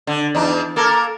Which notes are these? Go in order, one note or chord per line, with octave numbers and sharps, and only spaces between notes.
D3
E2 D4 D#4
A#3 A4 A#4